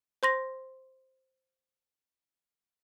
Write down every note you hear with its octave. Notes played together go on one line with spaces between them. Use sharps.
C5 C6 A#6